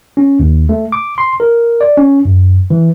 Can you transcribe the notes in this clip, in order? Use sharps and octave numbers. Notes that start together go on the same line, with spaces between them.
C#4
D#2
A3
D6
C6
A#4
D5
C#4
F#2
E3